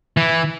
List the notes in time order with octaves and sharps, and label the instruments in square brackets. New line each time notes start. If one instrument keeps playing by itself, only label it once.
[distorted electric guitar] E3